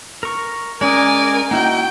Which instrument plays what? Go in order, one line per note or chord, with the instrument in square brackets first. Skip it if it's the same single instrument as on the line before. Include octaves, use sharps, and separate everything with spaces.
[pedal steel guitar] A#4 C#6
[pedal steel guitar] G#3 C#4 D#6 [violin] A#4 G#5 [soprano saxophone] D5
[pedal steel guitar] A#3 E4 F#4 [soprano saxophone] D#4 [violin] G5